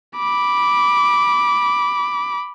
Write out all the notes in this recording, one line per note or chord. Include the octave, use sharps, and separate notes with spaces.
B5 D6